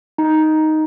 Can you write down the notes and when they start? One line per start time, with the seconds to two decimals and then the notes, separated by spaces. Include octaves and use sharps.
0.18 D#4